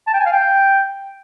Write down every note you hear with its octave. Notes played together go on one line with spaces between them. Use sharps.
A5
G5
G#5
F5
G5